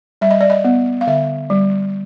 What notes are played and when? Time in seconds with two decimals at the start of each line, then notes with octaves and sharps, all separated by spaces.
0.21 G3 E5
0.31 D#5
0.41 D5
0.50 D#5
0.65 B3
1.01 F5
1.07 D3 E5
1.50 G3